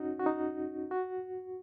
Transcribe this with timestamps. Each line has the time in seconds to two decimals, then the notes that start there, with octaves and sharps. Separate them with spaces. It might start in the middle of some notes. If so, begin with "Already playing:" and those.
Already playing: C#4 D#4 F#4
0.19 F#4
0.26 D#4
0.91 F#4